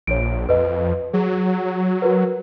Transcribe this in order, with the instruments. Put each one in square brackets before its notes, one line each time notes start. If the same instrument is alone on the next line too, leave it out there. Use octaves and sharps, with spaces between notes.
[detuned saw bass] A#1 [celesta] C#5 D7
[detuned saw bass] F2 [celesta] B4 D#5
[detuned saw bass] F#3 [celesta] G#4
[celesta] F#4 A#4 B4